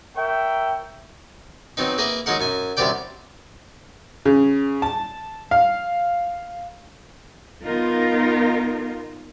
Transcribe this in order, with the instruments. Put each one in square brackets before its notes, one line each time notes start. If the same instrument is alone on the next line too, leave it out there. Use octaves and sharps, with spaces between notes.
[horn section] A#4 C#5 E5 G5
[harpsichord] F#3 B3 C4 D#4
A#3 G#4 A#4 B4 E5
F#3 G#3 D#4 A#4 F#5
F#2 G#5
C2 F#2 C3 G4 D5 G5
[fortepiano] C#3
A5
F5
[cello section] B3 D#4 F4 A#4